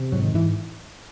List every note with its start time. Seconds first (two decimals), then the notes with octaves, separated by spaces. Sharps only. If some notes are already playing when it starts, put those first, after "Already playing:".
Already playing: C3
0.12 G#2 F#3
0.23 D#3
0.34 G#2 E3